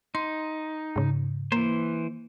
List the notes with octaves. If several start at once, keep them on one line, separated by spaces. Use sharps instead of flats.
D#4 C6
G#2 C#3
E3 A#3 C5